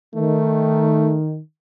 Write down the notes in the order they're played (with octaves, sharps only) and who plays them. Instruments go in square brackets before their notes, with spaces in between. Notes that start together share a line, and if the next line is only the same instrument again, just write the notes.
[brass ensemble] D#3 [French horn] A3